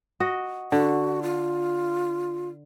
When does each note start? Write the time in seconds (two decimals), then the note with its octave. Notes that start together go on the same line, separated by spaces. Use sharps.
0.20 F#4 D#5
0.72 D3 F#4
1.22 F4